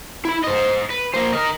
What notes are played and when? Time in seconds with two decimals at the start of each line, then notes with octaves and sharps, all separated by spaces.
0.25 E4 B5
0.44 C5 D#5
0.90 B4
1.14 A#3 C5
1.33 A#4 D#5